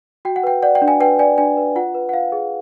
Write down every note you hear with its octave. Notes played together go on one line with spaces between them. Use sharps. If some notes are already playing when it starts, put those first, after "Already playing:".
F#4 G5
F#5
B4 G5
D5 F#5
G5
D4
G#5
B4 G5
D5 G#5
D4 G#5
B4
F4 F#5
B4
F#5
F4 F5
G#4